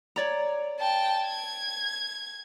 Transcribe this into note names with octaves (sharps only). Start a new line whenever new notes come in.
C#5 D5 A#5
G5 A5
G#6